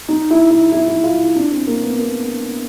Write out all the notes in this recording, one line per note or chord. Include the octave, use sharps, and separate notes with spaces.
D#4
E4
E4
E4
E4
F4
E4
D4
C4
A#3
B3
A#3